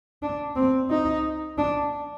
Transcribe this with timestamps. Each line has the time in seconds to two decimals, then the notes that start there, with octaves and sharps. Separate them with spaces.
0.22 D4
0.56 C4
0.90 D#4
1.58 D4